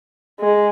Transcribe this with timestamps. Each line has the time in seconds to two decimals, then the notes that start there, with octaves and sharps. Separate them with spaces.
0.40 G#3